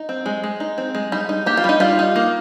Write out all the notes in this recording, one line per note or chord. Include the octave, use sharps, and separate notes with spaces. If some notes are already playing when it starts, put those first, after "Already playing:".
Already playing: D#4
C4
G#3
G#3
D#4
C4
G#3
G3 D#4
D#4
A#3 G4
F4
G3 D#4
G3 F4
D#4
A#3